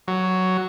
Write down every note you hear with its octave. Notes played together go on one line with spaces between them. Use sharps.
F#3